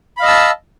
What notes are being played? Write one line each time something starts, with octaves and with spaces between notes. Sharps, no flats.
D#5 F5 A5 B5 E6